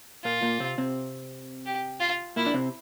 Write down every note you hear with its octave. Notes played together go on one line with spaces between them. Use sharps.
A#2 A#3 F4
A#2 A#3
C3 C4
C3 C4
G4
F4
A#2 A#3 E4
D4
C3 C4